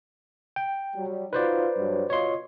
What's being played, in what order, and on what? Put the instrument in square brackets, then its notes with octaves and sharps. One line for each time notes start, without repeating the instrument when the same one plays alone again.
[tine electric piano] G5
[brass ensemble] F#3 G3
[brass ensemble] D#4 F4 F#4 [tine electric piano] B4 C5 D5
[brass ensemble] G2 F#3
[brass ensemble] B2 F4 D#5 [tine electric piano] C#5 C6